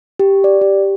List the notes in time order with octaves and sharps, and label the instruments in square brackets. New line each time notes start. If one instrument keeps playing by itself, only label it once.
[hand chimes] G4
D5
G4